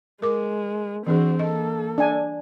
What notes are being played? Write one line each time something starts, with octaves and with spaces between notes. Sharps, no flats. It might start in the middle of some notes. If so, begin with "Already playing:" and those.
G#3 A#4 D6
E3 C4 D4 F#4 G#4
A#3 A4 D#5
D4 G#5